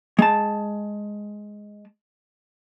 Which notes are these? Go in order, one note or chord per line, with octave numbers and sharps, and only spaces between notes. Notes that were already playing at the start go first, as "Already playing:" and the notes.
G#3 A5